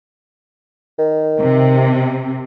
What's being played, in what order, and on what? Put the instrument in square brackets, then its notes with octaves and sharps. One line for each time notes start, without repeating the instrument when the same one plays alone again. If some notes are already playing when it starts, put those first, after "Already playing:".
[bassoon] D#3
[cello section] C3